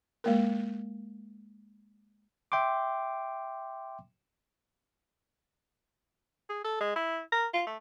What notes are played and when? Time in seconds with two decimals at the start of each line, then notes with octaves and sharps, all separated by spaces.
0.24 G#3 A#3 A#4
2.52 E5 G5 C6 D6
6.49 G#4
6.64 A4
6.80 G#3
6.96 E4
7.32 A#4
7.53 F4
7.67 A3